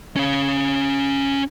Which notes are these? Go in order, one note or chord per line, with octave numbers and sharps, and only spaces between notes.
C#4 F5